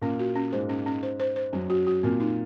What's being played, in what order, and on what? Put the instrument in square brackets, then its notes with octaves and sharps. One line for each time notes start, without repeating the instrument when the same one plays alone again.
[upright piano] A#2 A#3 [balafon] C#4
[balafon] F#4
C#4
[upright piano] G#2 G#3 [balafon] C5
[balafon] C#4
C#4
C5
C5
C5
[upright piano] F#2 F#3 [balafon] C#4
[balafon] F#4
F#4
[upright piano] A#2 A#3 [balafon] C4
[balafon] D#4